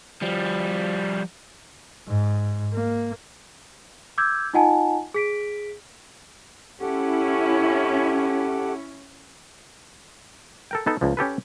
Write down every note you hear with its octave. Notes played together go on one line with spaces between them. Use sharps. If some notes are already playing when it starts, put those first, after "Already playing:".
F3 G3
G#2
A#3
D6 E6 G6 G#6
D#4 F4 D#5 F#5 G#5 A5
G#4 B6 D7
C#4 E4 G4 A4 F#5
A4 A#4 G5
B3 D#4 A4
C#2 F3
C#4 G4 A4 B4